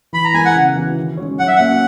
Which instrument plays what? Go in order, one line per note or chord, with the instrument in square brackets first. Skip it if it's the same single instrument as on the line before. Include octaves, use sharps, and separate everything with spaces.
[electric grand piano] E3 [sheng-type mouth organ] B5
[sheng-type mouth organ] A#5
[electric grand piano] G#3 B3 E4 A#4 [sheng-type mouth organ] G#5
[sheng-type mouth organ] F#5
[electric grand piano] C#3
E3 B3 F#4
D#3
G#3 C#4 F#4 C#5
[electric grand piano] F#3 [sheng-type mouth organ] F#5
[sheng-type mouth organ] E5
[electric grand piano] A#3 C#4 F#4 C#5 [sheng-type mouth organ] F#5